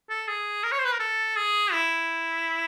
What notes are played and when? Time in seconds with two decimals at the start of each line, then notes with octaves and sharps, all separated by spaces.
0.10 A4
0.28 G#4
0.64 A#4
0.72 C#5
0.79 C5
0.85 B4
0.93 A#4
0.99 A4
1.36 G#4
1.72 E4